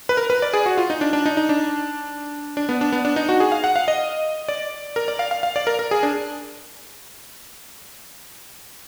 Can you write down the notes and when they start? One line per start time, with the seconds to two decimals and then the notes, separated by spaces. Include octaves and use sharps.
0.09 B4
0.17 A#4
0.30 B4
0.42 D5
0.53 G#4
0.66 F#4
0.77 F4
0.90 D#4
1.01 D4
1.13 D4
1.25 D#4
1.37 D#4
1.49 D4
2.57 D4
2.69 B3
2.81 D4
2.92 B3
3.05 D4
3.16 D#4
3.29 F#4
3.40 G#4
3.52 F5
3.64 F#5
3.76 F5
3.88 D#5
4.48 D5
4.96 A#4
5.08 D5
5.19 F5
5.31 F5
5.43 F5
5.56 D5
5.67 A#4
5.79 A#4
5.91 G#4
6.03 D4